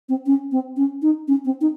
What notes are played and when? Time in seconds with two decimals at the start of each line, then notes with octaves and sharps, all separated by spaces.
0.09 C4
0.26 C#4
0.52 C4
0.77 C#4
1.02 D#4
1.28 C#4
1.45 C4
1.61 D#4